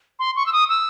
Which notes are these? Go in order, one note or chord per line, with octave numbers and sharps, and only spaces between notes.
C6
C#6
E6
D#6
E6